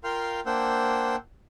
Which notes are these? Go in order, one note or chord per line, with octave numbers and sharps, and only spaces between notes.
F4 A#4 F5 G5 C6 F6
A#3 D4 C5 F#5 G5 E6